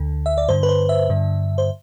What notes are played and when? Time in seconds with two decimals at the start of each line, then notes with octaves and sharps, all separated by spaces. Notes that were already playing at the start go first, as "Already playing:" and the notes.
Already playing: D2 D3
0.26 E5
0.38 D5
0.49 G2 D3 C5
0.63 B4
0.69 C5
0.89 E5
1.09 G2 D3
1.58 C5